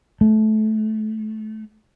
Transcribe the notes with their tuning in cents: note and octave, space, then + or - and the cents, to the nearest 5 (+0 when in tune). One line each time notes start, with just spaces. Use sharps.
A3 -20